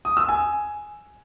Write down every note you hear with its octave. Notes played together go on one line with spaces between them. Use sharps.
D#6
E6
G#5